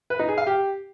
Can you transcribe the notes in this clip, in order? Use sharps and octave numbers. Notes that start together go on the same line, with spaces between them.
B4
D#4
G#4
F5
G4